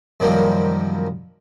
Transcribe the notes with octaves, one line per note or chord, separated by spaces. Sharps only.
F#2 C3 D#3 F3 G3 A#3